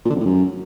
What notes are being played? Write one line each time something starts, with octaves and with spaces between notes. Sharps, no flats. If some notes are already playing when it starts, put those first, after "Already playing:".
A#2
D3
F2
A2
F#2